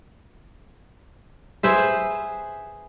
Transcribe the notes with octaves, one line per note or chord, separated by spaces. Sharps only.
G#4 B4 C5 E5